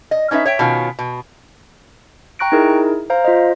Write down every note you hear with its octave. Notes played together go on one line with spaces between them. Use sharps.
D#5
C#4 D#4 B4 C#5 E5
C#5 E5 G5
B2 D#3 C#4 F4
B2
G5 A#5 C#6 F#6 A#6 D7
D#4 E4 G#4 A#4
C5 F5 A#5
F4 C5 D#5